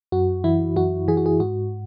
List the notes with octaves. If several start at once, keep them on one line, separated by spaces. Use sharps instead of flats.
F#2 F#4
E3 E4
F#2 F#4
E3 G#4
F#4
G#4
G#2 F#4